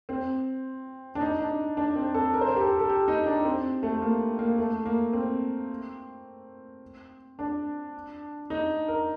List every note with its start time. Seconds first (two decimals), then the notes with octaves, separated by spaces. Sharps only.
0.09 C4
1.15 D4
1.21 D#4
1.40 D4
1.77 D4
1.95 C4
2.14 A4
2.34 A#4
2.41 C5
2.48 A#4
2.56 G4
2.61 A4
2.80 A4
2.89 G4
3.08 D#4
3.26 D4
3.45 C4
3.83 A3
4.02 A#3
4.39 A#3
4.58 A3
4.85 A#3
5.13 C4
7.39 D4
8.50 D#4
8.88 A#4